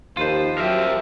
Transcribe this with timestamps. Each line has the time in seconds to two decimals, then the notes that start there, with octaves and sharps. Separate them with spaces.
0.17 D#2 F3 F4 B4 C5
0.58 F#3 G4 A#4 E5